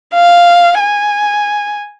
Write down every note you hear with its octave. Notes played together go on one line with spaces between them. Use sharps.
F5
G#5